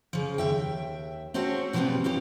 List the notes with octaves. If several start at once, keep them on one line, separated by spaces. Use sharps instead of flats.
C#3 F3
D#2 E5 G5
C4 C#4 F#4 A4 C5
B2 F3 G3 A3 B3 C4
C4 C#4 F4 G4